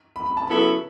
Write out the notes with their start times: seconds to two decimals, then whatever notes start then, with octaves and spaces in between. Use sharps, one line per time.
0.16 B5
0.26 B5
0.37 A5
0.47 C#3 F#3 B3 E4 A4 B5